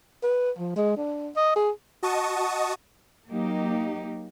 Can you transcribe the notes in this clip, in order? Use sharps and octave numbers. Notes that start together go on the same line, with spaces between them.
B4
F3
G#3
D4
D#5
G#4
F#4 D#5 A5 C#6 D#6
F#3 A#3 D#4 G4